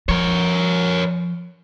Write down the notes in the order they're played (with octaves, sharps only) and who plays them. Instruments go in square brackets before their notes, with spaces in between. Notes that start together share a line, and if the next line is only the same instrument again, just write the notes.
[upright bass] F3 [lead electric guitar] A#4 C#5